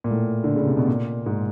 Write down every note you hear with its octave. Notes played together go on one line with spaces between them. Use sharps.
A#2
A2
D3
C#3
C3
B2
A#2
G#2